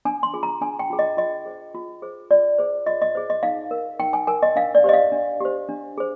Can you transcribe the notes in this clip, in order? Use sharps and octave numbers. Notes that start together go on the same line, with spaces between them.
D4 G#5
C6
F4 G#4
A#5
D4 G#5
G5
F4 G#4
D#5
F4 D#5
G#4 C5
F4
G#4 C5
F4 D5
G#4 C5
F4 D#5
D#5
G#4 C5
D#5
D#4 F5
A#4
D#4 G5
G#5
A#4 G#5
D#5
D4 F5
D5
G4 C5 D#5
F5
D4
G4 C5
D4
G#4 C5